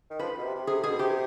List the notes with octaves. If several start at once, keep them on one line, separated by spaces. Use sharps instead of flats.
D#3
F3 B4
B2
C3
C3
C3 G#4
B2 G#4
C3 G4